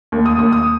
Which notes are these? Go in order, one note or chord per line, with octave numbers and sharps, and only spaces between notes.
D#2
D#6
D#2 D#6
D#6